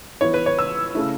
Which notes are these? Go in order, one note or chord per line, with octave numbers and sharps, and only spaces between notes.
E3 B3 E4 C#5
B4
C#5
E6
C#3 A3 E4